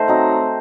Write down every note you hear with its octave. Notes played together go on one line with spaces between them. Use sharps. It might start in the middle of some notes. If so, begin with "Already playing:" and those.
Already playing: D#3 A3 C5
F#3 C4 D#4